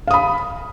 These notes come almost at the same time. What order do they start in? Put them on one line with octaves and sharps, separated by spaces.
F5 D#6 B5